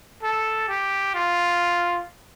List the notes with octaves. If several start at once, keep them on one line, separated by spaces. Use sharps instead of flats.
A4
G4
F4